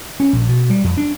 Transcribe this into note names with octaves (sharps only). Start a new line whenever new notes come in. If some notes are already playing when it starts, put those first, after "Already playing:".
C#4
A#1
B2
G3
F2
D4